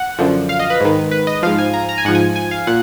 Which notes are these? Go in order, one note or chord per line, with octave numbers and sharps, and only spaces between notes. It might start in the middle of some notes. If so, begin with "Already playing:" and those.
Already playing: F#5
F#2 D3 F3
F5
D#5
B4
G#2 D#3
B4
D#5
G#2 F3 F5
G#5
A#5
A#5
G#5
G#2 F3 F#5
G#5
G#5
F5
A#2 F#5